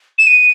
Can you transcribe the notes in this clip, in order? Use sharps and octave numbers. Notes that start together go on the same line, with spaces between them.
E7
D#7